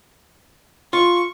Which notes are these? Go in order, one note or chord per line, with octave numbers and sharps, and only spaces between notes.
F4 C#6